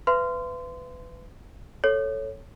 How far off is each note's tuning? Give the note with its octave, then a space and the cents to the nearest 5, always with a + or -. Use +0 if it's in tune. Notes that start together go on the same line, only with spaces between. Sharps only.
B4 +20 E5 +45 C6 -25
A4 +0 C#5 +0